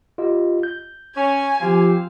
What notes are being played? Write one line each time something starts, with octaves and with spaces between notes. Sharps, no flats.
F4 G4 D#5
G6
C#4 G#5
F3 C4 G4 F5